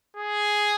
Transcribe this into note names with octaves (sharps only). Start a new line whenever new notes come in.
G#4